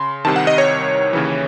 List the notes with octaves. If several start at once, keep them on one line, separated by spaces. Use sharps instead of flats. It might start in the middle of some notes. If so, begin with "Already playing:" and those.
Already playing: C#3 C6
C2 C3 D#3 A5
F#5
D#5
C#5
D#2 C#3 E3